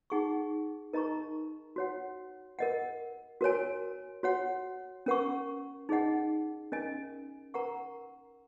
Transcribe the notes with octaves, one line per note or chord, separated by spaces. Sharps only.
D#4 G#4 F#5 C#6
D#4 A#4 D#5 A#5 C#6
F#4 C#5 F#5
A#4 D#5 F#5
F#4 A#4 C#5 G#5
F#4 C#5 F#5
C#4 A#4 F#5 C#6
D#4 G#4 D#5 F#5
C#4 A#4 D#5 G#5
A#4 F#5 A#5 C#6